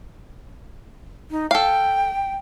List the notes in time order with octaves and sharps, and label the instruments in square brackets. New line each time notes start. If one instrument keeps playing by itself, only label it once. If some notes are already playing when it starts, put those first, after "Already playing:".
[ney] D#4
[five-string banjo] A4 F5 [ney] G5